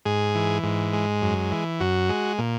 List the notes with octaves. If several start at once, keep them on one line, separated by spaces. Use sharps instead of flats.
G#2 G#4
E3
G#2
G#3
F#2
E3
F#2 F#4
G#3
A#2